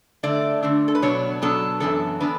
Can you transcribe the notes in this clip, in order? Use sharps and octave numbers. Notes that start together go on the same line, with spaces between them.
D3 A3 D4 D5
D3 A3 D4
A4
B4
B2 F#3 B3 D4 C#5
B2 F#3 B3 D4 A4
F#2 E3 B3 D4 A4
E3 B3 D4 B4